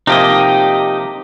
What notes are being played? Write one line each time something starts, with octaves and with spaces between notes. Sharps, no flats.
C3 F3 A#3 D#4 G4 D#5